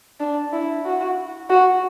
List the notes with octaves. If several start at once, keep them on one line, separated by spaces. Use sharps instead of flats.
D4
E4
F#4
F#4